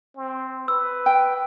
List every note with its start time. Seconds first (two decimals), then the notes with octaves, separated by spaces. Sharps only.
0.17 C4
0.68 B4 E6
1.06 G5